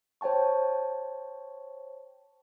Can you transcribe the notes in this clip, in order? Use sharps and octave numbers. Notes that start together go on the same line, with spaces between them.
C5 C#5 G5 A5 C#6